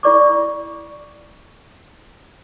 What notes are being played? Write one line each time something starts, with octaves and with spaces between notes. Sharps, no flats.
E4 A4 D5 C#6 D6